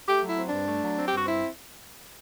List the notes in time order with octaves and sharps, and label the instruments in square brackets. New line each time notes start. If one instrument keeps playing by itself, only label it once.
[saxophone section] A3 G4
F#3
E4
C4
D4
G2
A3
F#3
C4
G4
G2 F#4
C4 E4